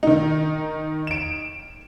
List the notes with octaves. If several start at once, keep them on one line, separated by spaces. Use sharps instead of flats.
D#3 D#4
D7 E7